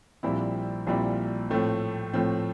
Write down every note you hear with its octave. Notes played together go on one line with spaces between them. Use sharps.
A#1 A#2 G3 C4 E4
A#1 A#2 G3 C4 E4
A2 F3 A3 C4
A2 F3 A3 C4